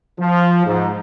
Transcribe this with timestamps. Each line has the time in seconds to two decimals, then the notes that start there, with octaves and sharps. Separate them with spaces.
0.19 F3
0.65 G#2